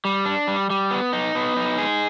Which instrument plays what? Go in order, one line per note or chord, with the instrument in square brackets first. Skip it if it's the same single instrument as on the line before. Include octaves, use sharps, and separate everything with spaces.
[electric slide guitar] G3
D4
G3
G3
B3
D#4
B3
D#4
G#4